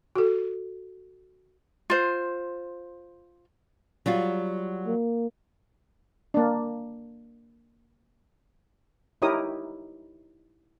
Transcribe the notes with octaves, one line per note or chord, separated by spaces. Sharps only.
F#4 A4
F4 C5
F#3 G3 F4
A#3
A#3 D4
D#4 E4 G4 A#4 C#5 D#6